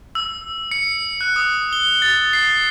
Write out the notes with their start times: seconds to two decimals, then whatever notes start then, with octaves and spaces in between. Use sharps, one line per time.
0.15 E6
0.71 C#7
1.21 F#6
1.36 D#6
1.73 G7
2.02 A6
2.33 C7